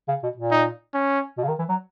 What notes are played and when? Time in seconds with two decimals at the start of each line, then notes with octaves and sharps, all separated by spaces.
0.08 C#3
0.23 B2
0.37 A#2
0.51 D#4
0.94 C#4
1.38 B2
1.44 C#3
1.48 D#3
1.59 E3
1.69 F#3